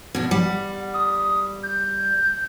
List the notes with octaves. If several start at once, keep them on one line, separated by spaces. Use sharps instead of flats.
B2 D4
G3 F#5
D#6
G6